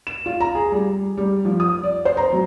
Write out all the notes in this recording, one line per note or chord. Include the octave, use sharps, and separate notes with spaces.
E7
F4
A#5
G#4
G3
G3
F3
D#6
D5
C5
A#5
F#3